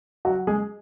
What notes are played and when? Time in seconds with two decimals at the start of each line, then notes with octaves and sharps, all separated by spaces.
0.25 F#3 F#4
0.47 G#3 G#4